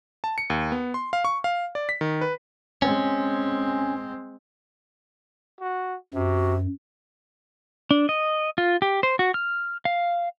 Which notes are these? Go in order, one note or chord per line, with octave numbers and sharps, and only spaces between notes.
A5
C#7
D#2
B3
C6
F5
C#6
F5
D5
B6
D#3
B4
G#3 C4 C#4
F#4
F#2 C3 F#4
D4
D#5
F4
G4
C5
F#4
F6
F5